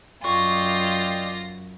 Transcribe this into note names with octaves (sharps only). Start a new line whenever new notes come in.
F#2 F4 D5 D#5 G5 C#6 A#6